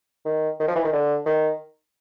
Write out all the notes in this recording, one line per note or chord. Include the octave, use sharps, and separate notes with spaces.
D#3
D#3
F3
E3
D#3
D3
D#3